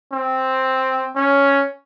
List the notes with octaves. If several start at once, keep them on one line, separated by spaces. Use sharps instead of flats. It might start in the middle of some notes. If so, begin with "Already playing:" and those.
C4
C#4